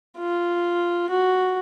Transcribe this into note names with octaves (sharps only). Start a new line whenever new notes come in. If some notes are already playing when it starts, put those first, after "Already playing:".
F4
F#4